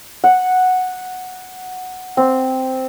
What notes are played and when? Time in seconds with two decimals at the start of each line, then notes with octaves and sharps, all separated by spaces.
0.24 F#5
2.17 C4